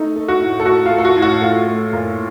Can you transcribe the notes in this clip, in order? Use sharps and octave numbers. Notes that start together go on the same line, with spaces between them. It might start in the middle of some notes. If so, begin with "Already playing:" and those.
Already playing: A3 D#4
A3
F#4
A2
A4
A3 F#4
F4
A3
A4
F#4
A2
F#4
A3 F4
A3
A#2